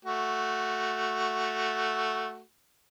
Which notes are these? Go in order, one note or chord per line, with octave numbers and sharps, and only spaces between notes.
A3 F#4